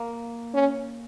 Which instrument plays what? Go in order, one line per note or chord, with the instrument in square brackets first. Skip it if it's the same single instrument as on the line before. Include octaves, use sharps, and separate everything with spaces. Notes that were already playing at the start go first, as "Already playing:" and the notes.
Already playing: [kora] A#3
[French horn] C#4